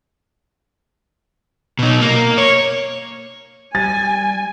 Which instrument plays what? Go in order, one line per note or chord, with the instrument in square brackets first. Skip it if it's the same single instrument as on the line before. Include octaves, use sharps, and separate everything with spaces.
[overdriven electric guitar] B2 D#4
A#3
C#5
[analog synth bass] G3 [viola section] G#5 [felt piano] A6